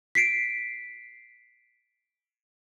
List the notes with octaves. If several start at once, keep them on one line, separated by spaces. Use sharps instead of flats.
B6 C7 D7